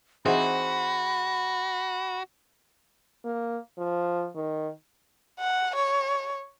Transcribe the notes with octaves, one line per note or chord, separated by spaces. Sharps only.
E3 C4 D#4 F#4 G#4 C5 F#5 B5
A#3
F3
D#3
F#5
C#5